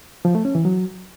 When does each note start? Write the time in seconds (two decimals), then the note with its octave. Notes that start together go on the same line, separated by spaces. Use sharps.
0.25 F3
0.35 A3
0.45 C#4
0.55 E3
0.65 F#3